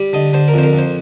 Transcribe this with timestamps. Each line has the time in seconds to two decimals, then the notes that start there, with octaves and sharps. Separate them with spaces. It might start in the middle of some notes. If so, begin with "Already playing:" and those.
Already playing: G3
0.13 D3 D#5
0.33 D3 C5
0.48 A#4
0.54 F2 C5
0.63 A#4
0.73 F2
0.79 C5